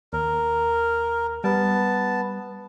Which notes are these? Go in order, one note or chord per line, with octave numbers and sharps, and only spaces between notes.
D#2 A#4
G3 B3 A5